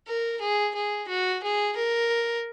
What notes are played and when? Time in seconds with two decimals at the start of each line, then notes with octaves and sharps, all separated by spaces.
0.08 A#4
0.41 G#4
0.75 G#4
1.09 F#4
1.43 G#4
1.76 A#4